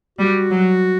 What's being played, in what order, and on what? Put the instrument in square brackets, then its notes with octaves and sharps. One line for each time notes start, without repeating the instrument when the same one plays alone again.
[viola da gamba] G3 [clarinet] F#4
[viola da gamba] F#3